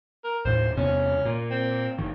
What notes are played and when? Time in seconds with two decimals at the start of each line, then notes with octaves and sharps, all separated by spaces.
0.24 A#4
0.45 D#2 A2 C5
0.77 E2 C3 B3 C#4
1.25 A#2
1.50 C4
1.98 F#1 D#3